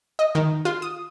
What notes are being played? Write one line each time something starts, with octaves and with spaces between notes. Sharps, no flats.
D#5
D#3
F4
D#6